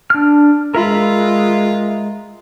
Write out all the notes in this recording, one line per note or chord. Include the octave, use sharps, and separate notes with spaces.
D4 F6
G#3 F4 A#4 E5 B5